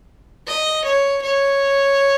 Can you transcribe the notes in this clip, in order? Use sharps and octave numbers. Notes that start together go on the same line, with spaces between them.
D#5
C#5
C#5